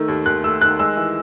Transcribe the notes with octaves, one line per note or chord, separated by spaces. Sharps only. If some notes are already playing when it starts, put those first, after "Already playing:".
Already playing: D#3 A3 E6
D#2
D#2 F#6
A3 E6
D#3 F#6
G#3 E6
E3